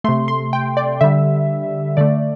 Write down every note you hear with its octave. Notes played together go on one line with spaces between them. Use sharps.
C3 A3 C6
C6
G5
D5
D3 G3 E5
D3 A3 D5